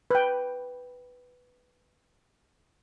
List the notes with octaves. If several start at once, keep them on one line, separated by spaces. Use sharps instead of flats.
B4 G5